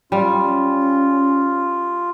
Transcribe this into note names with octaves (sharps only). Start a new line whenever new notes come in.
G3 C#4 F4